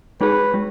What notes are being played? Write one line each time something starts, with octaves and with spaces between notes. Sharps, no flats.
G#3 D#4 G#4 B4
G#3